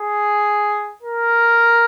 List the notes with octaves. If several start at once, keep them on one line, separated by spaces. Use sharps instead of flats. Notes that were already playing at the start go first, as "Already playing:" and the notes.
Already playing: G#4
A#4